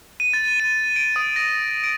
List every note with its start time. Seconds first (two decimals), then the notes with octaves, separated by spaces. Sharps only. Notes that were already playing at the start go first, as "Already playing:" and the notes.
0.20 D#7
0.33 A6
0.60 D#7
0.96 D7
1.16 D#6
1.36 A#6
1.84 D7